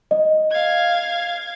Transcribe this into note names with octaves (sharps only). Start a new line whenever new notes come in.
D#5
F5 G#6